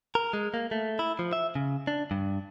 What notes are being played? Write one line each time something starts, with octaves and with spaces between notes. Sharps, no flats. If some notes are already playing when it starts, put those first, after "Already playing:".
A#4
G#3
A#3
A3
E4
F3
E5
C#3
D4
G2